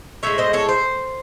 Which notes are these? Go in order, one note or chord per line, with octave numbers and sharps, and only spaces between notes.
A2 G#3 C#5 E5
C5 D#5
A4 C#5
C5